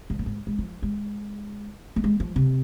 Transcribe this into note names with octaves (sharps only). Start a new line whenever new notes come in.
G#2
A2
G#2
G#3
F3
G#3
A3
G#3
F3
C3